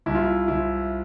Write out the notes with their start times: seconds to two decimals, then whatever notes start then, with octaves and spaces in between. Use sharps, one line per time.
0.06 C2 E4
0.15 F4
0.24 E4
0.48 C2 E4